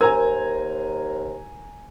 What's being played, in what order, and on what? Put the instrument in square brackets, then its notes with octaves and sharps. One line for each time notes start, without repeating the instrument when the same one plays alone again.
[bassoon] D#2 [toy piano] A#4 [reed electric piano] C5 [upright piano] G#5 A#5 G#6